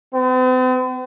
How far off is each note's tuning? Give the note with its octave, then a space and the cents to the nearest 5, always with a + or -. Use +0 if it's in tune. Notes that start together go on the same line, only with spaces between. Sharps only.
C4 -45